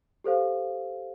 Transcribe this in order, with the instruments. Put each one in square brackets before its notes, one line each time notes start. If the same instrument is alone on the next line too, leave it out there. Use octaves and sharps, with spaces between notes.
[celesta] G4 A4 C5 F5